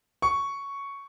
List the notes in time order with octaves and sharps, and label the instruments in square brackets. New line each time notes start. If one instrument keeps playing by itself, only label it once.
[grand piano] C#6